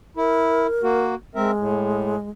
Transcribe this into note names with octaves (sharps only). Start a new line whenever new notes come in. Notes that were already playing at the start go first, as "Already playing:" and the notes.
E4 A#4
A#3 F#4
G#3 C4 A#4 E5
A2